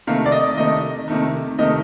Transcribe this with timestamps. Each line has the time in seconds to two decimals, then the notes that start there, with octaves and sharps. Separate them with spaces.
0.07 C3 D#3 A3 F5
0.26 D5
0.32 D#5
0.58 C3 D#3 A3 D#5
1.08 C3 D#3 A3
1.59 C3 D#3 A3 D#5